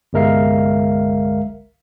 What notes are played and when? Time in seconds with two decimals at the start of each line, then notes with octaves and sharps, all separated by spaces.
0.13 G1 C2 G#3 A#4 E5 F5